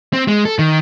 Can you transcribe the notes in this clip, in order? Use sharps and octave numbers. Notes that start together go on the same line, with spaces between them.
C4
G#3
A4
D#3